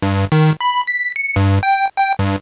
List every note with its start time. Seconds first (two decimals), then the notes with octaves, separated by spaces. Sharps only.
0.02 G2
0.32 D#3
0.61 B5
0.87 B6
1.16 C#7
1.36 G2
1.63 G5
1.98 G5
2.19 G2